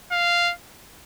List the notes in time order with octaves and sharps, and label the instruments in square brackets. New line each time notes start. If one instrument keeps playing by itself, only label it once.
[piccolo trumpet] F5